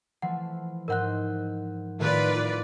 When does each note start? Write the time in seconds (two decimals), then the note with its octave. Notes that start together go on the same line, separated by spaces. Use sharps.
0.22 E3 F3 A3 F#5
0.88 G#2 A#4 C5 D#5 F#5 F#6
1.99 A2 D#3 A3 F4 B4 D5